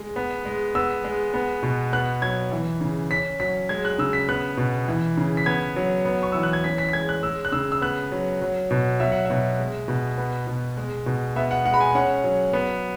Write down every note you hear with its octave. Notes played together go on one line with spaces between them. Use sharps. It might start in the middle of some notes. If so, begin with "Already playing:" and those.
Already playing: G#3
B3
G#3
B3 E6
G#3
B3
B2
B3 F#6
F#3 G#6
E3
C#3
C#4 B6
F#3 B6
G#3 G#6
F#6
C#3 E6
B6
B3 F#6
B2
E3
C#3
B6
B3 G#6
F#3
B3
C#6
E3 E6
F#6
G#6
C#4 B6
B6
B6
G#3 G#6
F#6
G#3 E6
F#6
C#3 E6
E6
B3 F#6
F#3
F#3
B2
F#3 E5
F#5
E5
B2
G#3
B2
B3
B2
G#3
B2
B3 E5
F#5
G#3 F#5
B5
G#5
C#4 F#5
F#3
B3